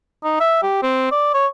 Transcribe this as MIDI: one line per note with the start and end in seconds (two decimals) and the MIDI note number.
0.24 0.36 63
0.40 0.59 76
0.62 0.81 67
0.83 1.09 60
1.11 1.33 74
1.34 1.46 73